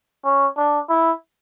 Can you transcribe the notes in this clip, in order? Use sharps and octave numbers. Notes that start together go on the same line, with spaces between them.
C#4
D4
E4